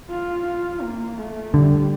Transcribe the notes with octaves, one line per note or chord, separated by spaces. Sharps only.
F4
F4
A#3
A3
D3 G3